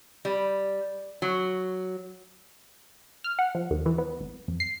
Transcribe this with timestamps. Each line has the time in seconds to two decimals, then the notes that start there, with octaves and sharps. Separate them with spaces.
0.25 G3
1.22 F#3
3.24 F6
3.39 F#5
3.55 F3
3.70 D#2
3.86 E3
3.98 B3
4.20 G#1
4.48 F2
4.60 C7